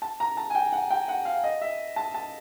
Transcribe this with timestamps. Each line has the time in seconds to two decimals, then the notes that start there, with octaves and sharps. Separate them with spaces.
0.02 A5
0.20 A#5
0.37 A5
0.50 G#5
0.55 G5
0.72 F#5
0.90 G5
1.08 F#5
1.25 F5
1.44 D#5
1.61 E5
1.96 A5
2.14 A5